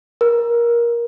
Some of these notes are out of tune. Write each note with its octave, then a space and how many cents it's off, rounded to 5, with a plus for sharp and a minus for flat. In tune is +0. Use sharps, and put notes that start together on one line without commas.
A#4 +20